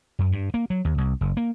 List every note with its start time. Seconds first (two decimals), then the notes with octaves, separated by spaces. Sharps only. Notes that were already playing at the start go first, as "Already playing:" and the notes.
0.19 F#2
0.32 G2
0.54 A#3
0.70 F#3
0.85 D#2
0.98 C2
1.21 F#1
1.37 A#3